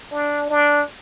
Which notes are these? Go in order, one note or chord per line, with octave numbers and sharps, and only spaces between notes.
D4
D4